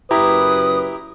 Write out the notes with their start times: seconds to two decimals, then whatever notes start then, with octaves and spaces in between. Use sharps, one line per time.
0.11 F#1 F#2 E4 G4 B4 A#5 D#6